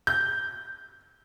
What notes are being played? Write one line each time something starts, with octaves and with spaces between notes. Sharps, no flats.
G6